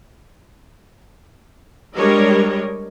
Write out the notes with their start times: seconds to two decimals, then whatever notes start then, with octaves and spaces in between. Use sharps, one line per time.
1.96 G3 G#3 D4 A#4 C#5 D#5